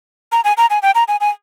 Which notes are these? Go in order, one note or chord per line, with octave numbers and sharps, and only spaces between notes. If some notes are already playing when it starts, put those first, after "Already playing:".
A#5
G#5
A#5
G#5
G5
A#5
G#5
G#5